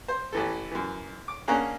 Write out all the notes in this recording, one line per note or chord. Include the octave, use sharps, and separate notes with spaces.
C5
A1 E3 A4
F#2 E3
D6
A#3 C#4 D4 G#4 F#5 A#5